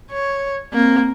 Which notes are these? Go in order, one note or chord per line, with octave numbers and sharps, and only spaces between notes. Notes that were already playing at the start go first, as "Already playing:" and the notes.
C#5
A#3 C4